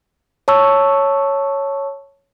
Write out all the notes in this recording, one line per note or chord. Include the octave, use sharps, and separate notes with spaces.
C#5 A5 C#6 E6